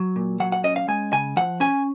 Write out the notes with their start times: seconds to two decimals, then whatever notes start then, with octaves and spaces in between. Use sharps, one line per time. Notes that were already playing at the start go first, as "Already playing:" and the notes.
Already playing: F#3
0.16 A#2
0.40 F#3 F#5
0.52 F#5
0.64 C#4 D#5
0.76 F5
0.88 G#3 G#5
1.12 C#3 G#5
1.37 F3 F#5
1.60 C#4 G#5